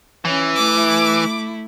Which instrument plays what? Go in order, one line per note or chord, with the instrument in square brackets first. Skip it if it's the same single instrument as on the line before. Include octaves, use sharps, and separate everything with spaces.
[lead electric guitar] E3 [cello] C#4
[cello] A3 E4 [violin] D6